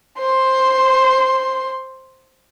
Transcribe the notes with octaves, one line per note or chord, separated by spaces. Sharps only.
C5 C6